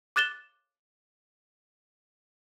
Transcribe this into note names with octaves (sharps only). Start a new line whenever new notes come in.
D6 F#6 A6 E7 G7